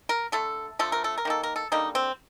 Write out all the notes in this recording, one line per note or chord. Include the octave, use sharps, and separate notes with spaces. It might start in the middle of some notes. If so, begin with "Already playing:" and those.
A#4
D3 A3 A4
D3 F3 A3 A4
A#4
A4
A#4
D#3 A#3 A4
A#4
A4
D3 G3 A#3 D#4
C4